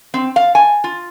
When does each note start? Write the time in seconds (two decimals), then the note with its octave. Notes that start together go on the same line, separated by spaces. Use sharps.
0.14 C4
0.36 F5
0.55 G#5
0.84 F4